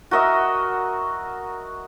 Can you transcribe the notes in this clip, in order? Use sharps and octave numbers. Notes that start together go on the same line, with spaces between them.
F#4 A#4 D#5 E5